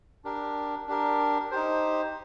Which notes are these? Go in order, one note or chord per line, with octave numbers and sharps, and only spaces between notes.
D4 G4 A#4
D4 G4 A#4
D#4 G4 C5